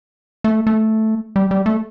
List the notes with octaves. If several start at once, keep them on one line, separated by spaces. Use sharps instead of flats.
A3
A3
G3
G3
A3